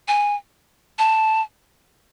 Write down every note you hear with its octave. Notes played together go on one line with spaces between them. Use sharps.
G#5
A5